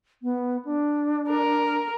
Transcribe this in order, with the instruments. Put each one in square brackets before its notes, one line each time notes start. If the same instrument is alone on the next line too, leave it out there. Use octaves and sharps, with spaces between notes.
[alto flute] B3
D4
[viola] A#4